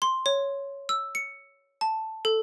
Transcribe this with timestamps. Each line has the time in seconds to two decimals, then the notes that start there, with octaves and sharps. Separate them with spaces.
0.02 C6
0.26 C#5
0.89 E6
1.15 C#7
1.81 A5
2.25 A4